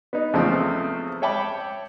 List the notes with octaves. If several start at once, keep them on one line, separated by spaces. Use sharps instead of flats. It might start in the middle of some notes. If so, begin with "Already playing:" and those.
B3 D#4
E2 C#3 F3 A3 C4
C#5 E5 G5 A5 B5 D6